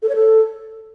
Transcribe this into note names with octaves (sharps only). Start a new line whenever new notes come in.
A4
C#5
A4